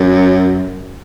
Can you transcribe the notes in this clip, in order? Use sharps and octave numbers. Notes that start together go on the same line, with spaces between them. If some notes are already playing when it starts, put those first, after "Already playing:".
Already playing: F#2